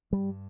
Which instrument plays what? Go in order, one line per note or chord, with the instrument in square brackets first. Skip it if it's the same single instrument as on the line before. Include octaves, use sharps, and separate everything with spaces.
[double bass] G2 [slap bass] G3